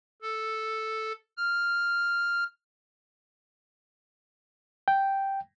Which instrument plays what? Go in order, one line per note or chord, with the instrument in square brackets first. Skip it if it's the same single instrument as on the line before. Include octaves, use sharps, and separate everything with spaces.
[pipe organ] A4
F6
[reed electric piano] G5